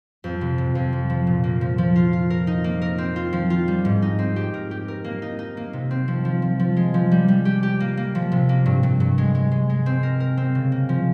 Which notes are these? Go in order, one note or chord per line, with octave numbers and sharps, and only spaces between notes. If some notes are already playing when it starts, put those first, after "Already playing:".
F2
C3
C3
F2
F3
F3
A#2
A#3
F3
F3
F4
F4
A#4
D#4
A#3
A#4
C4
F4
F3
F4
G3
G#2
D#4
C4
G4
A#4
G4
A#4
A#3
D#4
D#4
A#3
C3
C4
F3
F3
F3
F3
G#3
F3
G3
G3
G4
G4
A#3
A#3
F3
C3
A#3
G2
G2
G2
G#3
G#3
G#3
G#3
C4
A#4
A#4
C4
C#3
A#3
F3